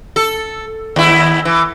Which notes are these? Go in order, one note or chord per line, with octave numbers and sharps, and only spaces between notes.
A4
D#2 E4
E3